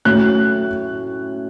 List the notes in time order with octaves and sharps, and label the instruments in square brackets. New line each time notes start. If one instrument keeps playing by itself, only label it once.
[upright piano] A2 F#3 A3 C#4 F#6